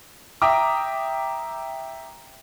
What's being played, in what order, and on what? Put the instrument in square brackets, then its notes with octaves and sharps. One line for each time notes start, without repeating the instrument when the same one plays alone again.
[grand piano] E5 G5 A#5 D6 D#6